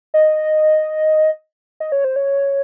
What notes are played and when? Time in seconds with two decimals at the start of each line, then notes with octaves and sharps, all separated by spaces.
0.14 D#5
1.80 D#5
1.92 C#5
2.04 C5
2.16 C#5